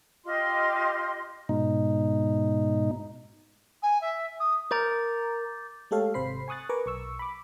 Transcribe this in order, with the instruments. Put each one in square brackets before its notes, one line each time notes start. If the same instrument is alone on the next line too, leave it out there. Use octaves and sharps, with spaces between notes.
[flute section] F4 G4 D#5 C6
[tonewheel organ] G#2 B2 D#4
[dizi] G#5
E5
D#6
[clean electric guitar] A#4 [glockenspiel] D6 G6 A6
[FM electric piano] G#3 A3 G4 A4 C#5 F5
G#1 C3 C5 B5 C7
G#5 C#6 D#6 F#6 A6
A#4 B4 G#5 A#5 C#6 D6
B1 C#6 E6
B5 D6